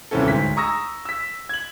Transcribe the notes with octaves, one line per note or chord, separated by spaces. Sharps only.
D#1 C2 E3 C4 C#4 A4
D2 G#2 B6
A#5 C#6 D#6 E6 A#6
E6 B6
G#6 F#7